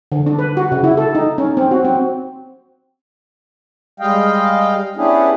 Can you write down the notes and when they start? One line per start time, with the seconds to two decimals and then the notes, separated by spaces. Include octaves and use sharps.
0.12 D3
0.26 D4
0.39 B4
0.57 F#4
0.72 C#3
0.84 E4
0.97 A4
1.15 D#4
1.38 C#4
1.57 C4
1.71 F#4
1.85 C4
4.00 G3 G#3 D#5 F5 G5
4.97 B3 C#4 D4 E4 G4 G#4